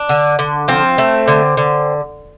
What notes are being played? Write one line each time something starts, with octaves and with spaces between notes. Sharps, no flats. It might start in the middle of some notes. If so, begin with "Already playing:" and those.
Already playing: D4
D3
D3
F3 C4
A3
D3
D3